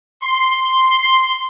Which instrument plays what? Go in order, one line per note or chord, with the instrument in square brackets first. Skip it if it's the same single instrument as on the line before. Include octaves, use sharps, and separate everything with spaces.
[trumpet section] C6